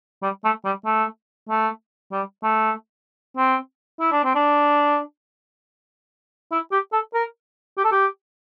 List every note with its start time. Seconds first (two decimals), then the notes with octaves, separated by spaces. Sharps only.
0.23 G3
0.45 A3
0.65 G3
0.86 A3
1.49 A3
2.12 G3
2.43 A3
3.37 C4
4.00 E4
4.12 D4
4.24 C4
4.35 D4
6.52 E4
6.72 G4
6.93 A4
7.14 A#4
7.78 G4
7.85 A4
7.92 G4